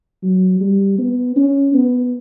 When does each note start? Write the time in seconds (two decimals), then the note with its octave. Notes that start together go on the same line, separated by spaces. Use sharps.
0.23 F#3
0.60 G3
0.98 B3
1.36 C#4
1.74 B3